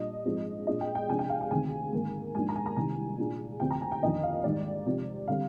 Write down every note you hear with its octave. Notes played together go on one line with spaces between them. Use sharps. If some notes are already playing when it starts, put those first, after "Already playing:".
Already playing: A#2 G3 D4 D#5
G#2 F3 G#3 C4
A#2 G#3 D4 D#5
G5
G5
C3 F3 G#3 D4 G#5
G5
F5
G5
D2 C3 D#3 G#3 C4 G#5
G#2 D#3 A#3
G#2 F3 A#3 D4 G#5
A#5
G#5
A#5
C2 C3 D#3 G#5
A#2 G#3 D4
D2 C3 F3 C4 G5
A#5
G#5
G5
F2 D#3 A#3 D4 D#5
F5
G#2 D#3 G3 D5
C3 F3 C4
D3 G3 C4 F5